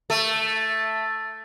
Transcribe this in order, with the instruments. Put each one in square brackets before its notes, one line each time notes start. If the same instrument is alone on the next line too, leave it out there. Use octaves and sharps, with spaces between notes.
[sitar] A3